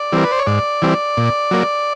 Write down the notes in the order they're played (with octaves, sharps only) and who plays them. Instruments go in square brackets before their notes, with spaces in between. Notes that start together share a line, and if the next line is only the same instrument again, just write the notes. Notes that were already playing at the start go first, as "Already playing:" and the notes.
Already playing: [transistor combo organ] D5
E3 G3 C4 A#4
B4
C5
C#5
G#2 D5
E3 G3 C4
A#2
F#3 A#3